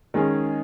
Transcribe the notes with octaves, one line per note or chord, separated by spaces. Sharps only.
D#3 G#3 C#4 G#4